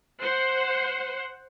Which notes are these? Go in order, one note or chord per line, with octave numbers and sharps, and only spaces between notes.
C5 F#5